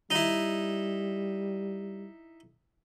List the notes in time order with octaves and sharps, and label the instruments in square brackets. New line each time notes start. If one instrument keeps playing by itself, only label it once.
[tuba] G3 [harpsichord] D#4 E4